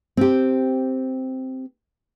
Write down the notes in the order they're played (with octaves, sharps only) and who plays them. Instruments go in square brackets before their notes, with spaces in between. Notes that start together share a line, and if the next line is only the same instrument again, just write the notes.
[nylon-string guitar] C4 G4